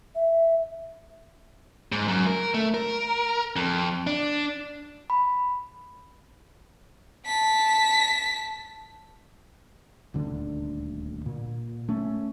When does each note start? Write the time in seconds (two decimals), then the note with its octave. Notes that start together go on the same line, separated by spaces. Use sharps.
0.15 E5
1.92 G#2
2.08 F#2
2.27 A#4
2.54 A3
2.74 A#4
3.56 F2
4.07 D4
5.10 B5
7.26 A5 B6
10.14 D#1 D2 D3 D4
11.26 A#2
11.89 A3 C#4